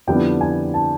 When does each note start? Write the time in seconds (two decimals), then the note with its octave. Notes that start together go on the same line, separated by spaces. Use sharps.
0.07 F2 D3 G3 B3 E4 G5
0.41 G#5
0.74 A5